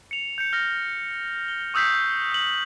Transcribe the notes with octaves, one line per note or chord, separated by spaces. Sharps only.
C#7 F7
G6 C#7
F6 A#6
G7
C#6 D#6 E6 G6 B6 C7
E6 F#7